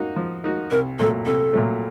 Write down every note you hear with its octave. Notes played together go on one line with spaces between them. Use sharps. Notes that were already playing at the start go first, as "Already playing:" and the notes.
Already playing: A#3 D#4 F#4
F3
A#3 D#4 F#4
C2 A#4
A#2 F#3 A3 A4
C2 A4
A#2 F#3 A3